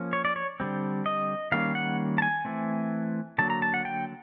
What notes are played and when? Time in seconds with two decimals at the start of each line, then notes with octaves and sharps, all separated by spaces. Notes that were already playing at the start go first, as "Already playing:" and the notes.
Already playing: F3 A#3 C#4
0.13 C#5
0.25 D5
0.36 C#5
0.60 D3 G3 C4
1.06 D#5
1.52 D#3 G3 A#3 C#4 F5
1.75 F#5
2.18 A5
2.22 G#5
2.45 E3 A3 C4
3.38 D3 F#3 A#3 A5
3.50 A#5
3.62 A5
3.74 F#5
3.85 G5